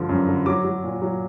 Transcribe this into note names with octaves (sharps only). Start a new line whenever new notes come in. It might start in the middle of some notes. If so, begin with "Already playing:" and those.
Already playing: G2 D3 F3
F#2
D3
F#3 D6
F#3
A#2
F#3